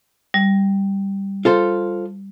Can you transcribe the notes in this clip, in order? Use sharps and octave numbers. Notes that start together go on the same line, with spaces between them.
G3
F4 A4 C5